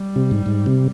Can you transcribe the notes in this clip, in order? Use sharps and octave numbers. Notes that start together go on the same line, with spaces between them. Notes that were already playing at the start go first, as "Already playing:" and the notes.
Already playing: G3
C3
G#2
G#2
C3